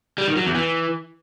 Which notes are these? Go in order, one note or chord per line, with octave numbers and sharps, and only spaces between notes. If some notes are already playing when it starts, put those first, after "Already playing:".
G3
D#3
F#3
E2
E3